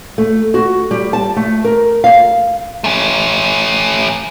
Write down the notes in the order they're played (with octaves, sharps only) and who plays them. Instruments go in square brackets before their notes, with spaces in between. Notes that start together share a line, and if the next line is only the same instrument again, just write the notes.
[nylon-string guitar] A3
F#4
G3
A5
A3
A#4
F5
[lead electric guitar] A3 C#4